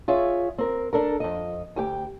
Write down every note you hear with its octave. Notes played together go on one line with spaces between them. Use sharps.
F4 G#4 C#5 E5
C4 A#4
D4 A4 A#4
F2 D#5
D2 G4 G5